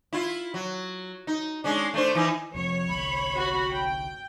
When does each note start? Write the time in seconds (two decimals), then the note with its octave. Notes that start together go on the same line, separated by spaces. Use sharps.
0.13 E4 F4
0.54 F#3
1.27 D#4
1.64 G#3 C#4 D4
1.94 A3 D4 C5
2.15 E3 D#4 E4
2.55 F1 F2 C#5
2.89 G1 C2 B5
3.37 F#4
3.71 G5